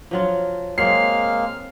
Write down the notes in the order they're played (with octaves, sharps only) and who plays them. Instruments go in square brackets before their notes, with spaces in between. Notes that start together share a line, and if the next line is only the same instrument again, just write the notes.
[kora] F3 F#3 F4
[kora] F#3 C4 [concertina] G#3 A#3 F6 [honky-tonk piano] C7